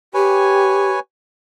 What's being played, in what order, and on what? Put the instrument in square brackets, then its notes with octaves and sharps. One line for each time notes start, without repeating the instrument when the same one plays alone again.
[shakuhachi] G4 [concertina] B4 C#5 G#5